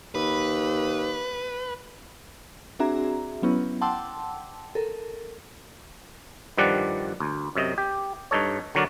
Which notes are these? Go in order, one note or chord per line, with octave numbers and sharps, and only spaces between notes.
D#2 B4
C4 D4 F#4 G#4 E5 A#5
F#3 B3 C#4 E4
F#5 G5 A5 C6 D6 E6
A4 A#4
G2 D#3 F3 G3 D5 F#5
D2
F#2 C3 D#5
G4
G2 D#4 A4 C#5
D3 F#3 F#4 A#4 D5